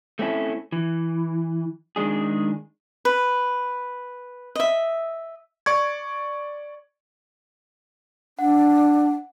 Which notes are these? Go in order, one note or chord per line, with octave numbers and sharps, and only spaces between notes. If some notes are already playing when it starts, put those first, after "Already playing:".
A3 C4 C#4 E4 A4
E3
D#3 G#3 D4 G#4
B4
D#5 E5
D5 C#6 G#6
D4 F#5